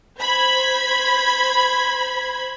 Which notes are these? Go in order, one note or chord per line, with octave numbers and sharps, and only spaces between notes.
C5 B5 G#6